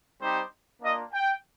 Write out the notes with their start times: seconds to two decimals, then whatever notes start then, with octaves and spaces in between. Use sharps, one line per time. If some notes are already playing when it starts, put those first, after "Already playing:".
0.21 G3 C4 D#4 G4 C5
0.82 A#3 D4 F4 D#5
1.13 G5